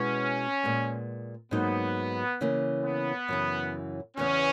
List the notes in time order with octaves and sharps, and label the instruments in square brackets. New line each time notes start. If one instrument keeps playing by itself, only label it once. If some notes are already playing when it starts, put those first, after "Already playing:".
Already playing: [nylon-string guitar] B2 G#3 B3 E4 [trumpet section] C#4
[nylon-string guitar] A#2 G#3 B3
[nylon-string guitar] G#2 F#3 A#3 D#4 [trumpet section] B3
[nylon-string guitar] C#3 E3 A#3
[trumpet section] B3
[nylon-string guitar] F#2 C#3 E3
[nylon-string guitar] E2 C#3 E3 B3 [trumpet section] C#4